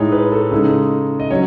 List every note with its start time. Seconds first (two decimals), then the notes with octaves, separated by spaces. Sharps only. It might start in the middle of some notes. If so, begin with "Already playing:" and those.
Already playing: A2 G#3 D#4 G#4 C#5
0.12 B4
0.32 A4
0.51 C#3 G#3 D#4
1.20 D#5
1.30 F#3 C#4 C#5